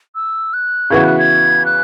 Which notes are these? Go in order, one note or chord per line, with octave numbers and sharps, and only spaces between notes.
E6
F#6
C#3 E3 B3 F#4 G#6
F#6
G#6
F#6